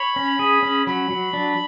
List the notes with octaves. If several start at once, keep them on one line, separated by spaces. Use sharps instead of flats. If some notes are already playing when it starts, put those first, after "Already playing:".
Already playing: C#5 B5
C#4
G#4
C#4
F#3 B5
F#3
D4